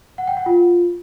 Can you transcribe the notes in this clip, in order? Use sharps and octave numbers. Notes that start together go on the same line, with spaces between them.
F#5
G5
F#5
F4